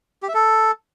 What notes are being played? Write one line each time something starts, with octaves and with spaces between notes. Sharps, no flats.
G4
E5
A4